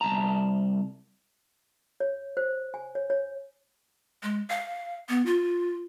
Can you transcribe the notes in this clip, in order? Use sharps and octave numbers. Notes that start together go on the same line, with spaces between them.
C2 A5 A#5
C#5
C5
G#5
C#5
C#5
G#3
F5
B3
F4